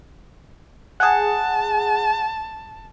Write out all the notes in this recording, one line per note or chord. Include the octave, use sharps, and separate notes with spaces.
G#4 F#5 A5